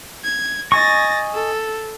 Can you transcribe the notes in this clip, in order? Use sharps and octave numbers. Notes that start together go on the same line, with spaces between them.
G#6
D#5 G#5 C#6 A6 A#6
A4